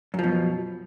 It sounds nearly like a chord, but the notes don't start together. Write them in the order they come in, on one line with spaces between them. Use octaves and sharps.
F#2 F3 B2